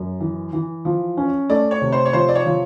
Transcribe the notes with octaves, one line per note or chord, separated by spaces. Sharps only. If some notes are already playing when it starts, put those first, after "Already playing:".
Already playing: F#2
E3
E3
F3
C#4
A3 D5
C#5
C3
C5
C#5
F3 C5
D5
C#5
F3